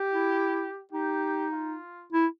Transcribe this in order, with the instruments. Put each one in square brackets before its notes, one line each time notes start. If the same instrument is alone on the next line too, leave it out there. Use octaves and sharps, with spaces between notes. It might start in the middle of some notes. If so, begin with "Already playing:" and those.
Already playing: [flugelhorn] G4
[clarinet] E4
[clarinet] D#4 [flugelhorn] G4
[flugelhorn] F4
[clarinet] E4